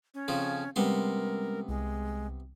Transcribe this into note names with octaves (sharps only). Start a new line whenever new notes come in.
C#4
F2 C#3 F3
C3 G3 G#3 B3 C#4 A#4 C6
C2 G#3